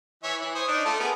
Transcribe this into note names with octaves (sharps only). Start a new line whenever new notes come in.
E3 C#5 E5
E3
C5 C#5 D#6
D4 D#4
A3 F4 A5
B3 G#4 A#4